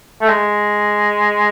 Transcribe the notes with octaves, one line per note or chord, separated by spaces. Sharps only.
A3
G#3